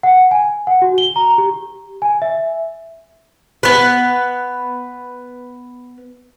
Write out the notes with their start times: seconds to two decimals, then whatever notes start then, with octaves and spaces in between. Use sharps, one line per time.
0.03 F#5
0.31 G#5
0.67 F#5
0.82 F#4
0.98 G7
1.16 A#5
1.38 G4
2.02 G#5
2.22 E5
3.63 B3 B4